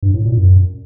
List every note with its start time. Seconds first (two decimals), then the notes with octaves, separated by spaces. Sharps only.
0.03 G2
0.14 A2
0.25 A#2
0.37 F#2